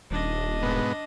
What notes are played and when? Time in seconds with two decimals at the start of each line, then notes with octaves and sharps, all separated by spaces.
0.11 D#1 D4 D#5
0.63 G#2 B2 B3